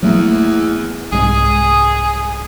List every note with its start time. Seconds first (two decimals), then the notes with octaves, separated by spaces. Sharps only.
0.03 E2 F#3 A3 A#3
1.12 C2 G#2 G#3 G#4